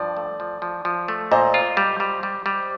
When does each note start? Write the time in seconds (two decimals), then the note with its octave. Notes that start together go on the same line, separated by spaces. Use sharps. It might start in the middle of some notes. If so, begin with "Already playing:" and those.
Already playing: G2 F3 D5
0.17 A3
0.40 F3
0.62 F3
0.85 F3
1.08 A3
1.31 A#2 C5 D#5
1.54 F4
1.77 G3
2.00 G3
2.23 G3
2.46 G3